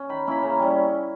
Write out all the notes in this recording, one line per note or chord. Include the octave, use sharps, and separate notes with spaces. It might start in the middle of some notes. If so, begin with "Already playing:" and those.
Already playing: C#4
D#3 B5
A#3 C#4 E4 B5
C#3 A#5
G3 C#4